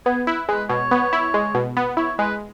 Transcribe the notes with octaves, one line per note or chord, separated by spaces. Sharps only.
B3 G#4
E4 B4
G#3 B4
B2 C#5
B3
E4
G#3
B2
B3
E4 C#5
G#3 B4